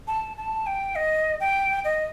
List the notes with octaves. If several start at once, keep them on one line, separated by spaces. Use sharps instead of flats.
A5
A5
G5
D#5
G5
D#5